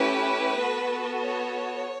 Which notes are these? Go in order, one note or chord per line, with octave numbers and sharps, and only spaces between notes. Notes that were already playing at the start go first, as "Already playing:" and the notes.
Already playing: A3 C#4 E4 G4 B4
B3 F#4 A4
C#5